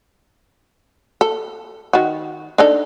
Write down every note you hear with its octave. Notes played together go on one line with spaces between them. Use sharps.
A4
D#3 F#4
D4 D#4 A4